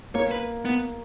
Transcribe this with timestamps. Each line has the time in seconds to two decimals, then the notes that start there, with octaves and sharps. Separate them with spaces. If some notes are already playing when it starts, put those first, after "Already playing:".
0.15 A#3 C#5
0.31 B4
0.65 B3